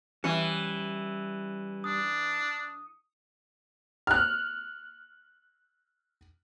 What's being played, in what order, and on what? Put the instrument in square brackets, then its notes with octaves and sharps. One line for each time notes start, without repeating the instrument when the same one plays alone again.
[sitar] E3 [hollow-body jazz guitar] G3 C#4 E5 [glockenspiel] C#7 D#7
[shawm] D4 [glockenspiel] D#6
[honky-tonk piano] F6 F#6